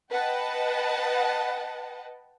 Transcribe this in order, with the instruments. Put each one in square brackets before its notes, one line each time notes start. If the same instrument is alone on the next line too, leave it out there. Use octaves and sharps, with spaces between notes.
[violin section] B4 D#5 F#5 G5 A5